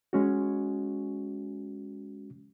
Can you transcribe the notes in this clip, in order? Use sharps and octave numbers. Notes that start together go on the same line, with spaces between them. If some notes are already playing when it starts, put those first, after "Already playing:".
G#3 C#4 F#4